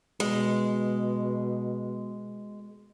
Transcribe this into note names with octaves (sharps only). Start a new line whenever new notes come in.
B2 G#3